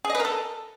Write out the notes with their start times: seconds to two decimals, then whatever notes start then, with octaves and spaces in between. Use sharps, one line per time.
0.05 G#4
0.10 D#5
0.15 B4
0.20 A#4
0.25 A4